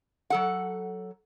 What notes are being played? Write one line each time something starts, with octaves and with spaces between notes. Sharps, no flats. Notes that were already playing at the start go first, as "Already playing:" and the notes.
F#3 A4 F#5